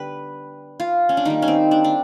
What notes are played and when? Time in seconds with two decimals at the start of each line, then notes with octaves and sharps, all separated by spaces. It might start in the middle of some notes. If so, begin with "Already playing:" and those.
Already playing: D3 G3 B3 G4 B4
0.80 F4
1.09 C#4
1.17 D4
1.25 D#3 G3 A#3 D#4
1.42 C#4
1.48 C4
1.71 D4
1.84 D4